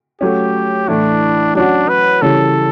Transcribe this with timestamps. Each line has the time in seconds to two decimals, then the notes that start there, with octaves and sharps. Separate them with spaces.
0.21 F#3 A3 C#4 G4
0.88 A2 E3 A3 D4 E4
1.55 F#3 C#4 D4 F#4
1.89 B4
2.22 C#3 E3 G3 C#4 A4